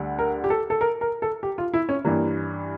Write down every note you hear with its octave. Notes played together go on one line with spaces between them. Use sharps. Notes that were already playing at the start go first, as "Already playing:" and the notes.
Already playing: D2 D3 G3
A#4
G4
A4
A4
A#4
A#4
A4
G4
F4
E4
C#4
G2 E3 G3 A#3